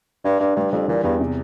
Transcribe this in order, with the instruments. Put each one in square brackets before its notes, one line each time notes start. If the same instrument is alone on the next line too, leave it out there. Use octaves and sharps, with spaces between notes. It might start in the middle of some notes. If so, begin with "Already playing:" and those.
[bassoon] G2 [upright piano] D4
[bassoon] G2 [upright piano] D4
[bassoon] G2 [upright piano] G3
[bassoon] F2 [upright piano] G3
[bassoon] A#2 [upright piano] E3
[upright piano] E2 [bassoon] G2
[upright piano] C3